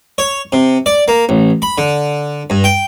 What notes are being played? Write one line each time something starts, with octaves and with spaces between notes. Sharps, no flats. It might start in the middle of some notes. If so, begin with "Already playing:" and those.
C#5
C3
D5
A#3
A1
B5
D3
G2
G5